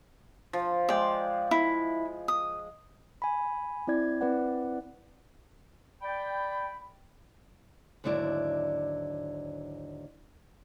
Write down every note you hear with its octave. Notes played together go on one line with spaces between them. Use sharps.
F3
G#3 D5 G5
E4
D#6
G#5 B5
C4 E4 D5 G#6
C4 E4 B4 D5 F#5
D5 G5 B5
D#2 G#2 D3 F#3 E4 D5